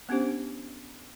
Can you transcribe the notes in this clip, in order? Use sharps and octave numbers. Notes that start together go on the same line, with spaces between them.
B3 C#4 D4 G4 C5